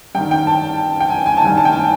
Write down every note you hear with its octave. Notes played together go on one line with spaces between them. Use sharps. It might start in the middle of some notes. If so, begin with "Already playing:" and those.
G2 D#3 G5
G5
A5
G5
G#5
G#5
A5
G2 D#3 G#5
A5
G5
G#5